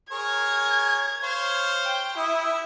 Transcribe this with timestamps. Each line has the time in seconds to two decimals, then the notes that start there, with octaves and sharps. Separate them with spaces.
0.12 G#4 A#4 C#5 G#6
1.23 C5 C#5 F5
1.85 G5
2.18 E4 E5 D#6